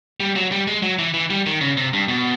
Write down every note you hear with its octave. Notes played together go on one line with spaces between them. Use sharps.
G3
F#3
G3
G#3
F#3
E3
E3
G3
D#3
C#3
C3
G2
B2